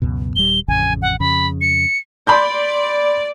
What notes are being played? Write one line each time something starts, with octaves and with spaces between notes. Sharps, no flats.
C#2 F#2 B2
D#1 G3 G7
A1 F2 C#3 G#5
F#5
F2 C#3 B5
C#7
D5 B5 C6 G6